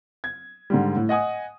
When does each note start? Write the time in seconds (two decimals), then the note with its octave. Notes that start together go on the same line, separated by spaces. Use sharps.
0.24 G#6
0.70 G#2 D3 G3
0.96 A2
1.09 D#5 F#5 G#5 D#6